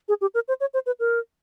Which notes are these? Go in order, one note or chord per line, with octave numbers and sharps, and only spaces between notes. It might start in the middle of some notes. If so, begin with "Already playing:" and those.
G#4
G4
A#4
C5
C#5
C5
B4
A#4